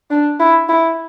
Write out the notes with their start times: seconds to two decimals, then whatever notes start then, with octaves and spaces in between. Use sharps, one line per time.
0.11 D4
0.40 E4
0.69 E4